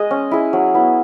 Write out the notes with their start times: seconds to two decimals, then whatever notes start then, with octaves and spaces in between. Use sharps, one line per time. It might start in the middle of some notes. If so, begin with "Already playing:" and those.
Already playing: G#3 G#4 D#5
0.11 C#4
0.31 E4 G#4
0.53 F#3
0.74 B3 E4